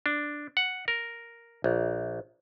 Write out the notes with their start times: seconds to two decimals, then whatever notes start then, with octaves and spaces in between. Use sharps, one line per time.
0.06 D4
0.57 F#5
0.88 A#4
1.64 A#1